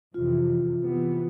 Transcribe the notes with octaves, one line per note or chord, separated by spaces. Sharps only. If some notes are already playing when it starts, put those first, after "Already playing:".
F2 C3 E3 F4
C3 E3 B3